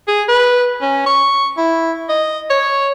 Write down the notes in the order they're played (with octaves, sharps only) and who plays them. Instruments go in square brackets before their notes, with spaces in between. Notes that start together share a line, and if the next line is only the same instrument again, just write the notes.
[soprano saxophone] G#4
B4
C#4
C#6
E4
D#5
C#5